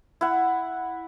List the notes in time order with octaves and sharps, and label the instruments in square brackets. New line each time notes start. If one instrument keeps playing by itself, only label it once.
[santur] E4 F#5